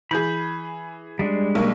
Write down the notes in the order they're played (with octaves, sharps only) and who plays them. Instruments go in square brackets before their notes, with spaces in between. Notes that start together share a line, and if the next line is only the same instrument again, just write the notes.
[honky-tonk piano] E3 G#4 [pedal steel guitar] B5 G6
[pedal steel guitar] G3 G#3 D4
[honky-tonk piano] B1 A#3 C#6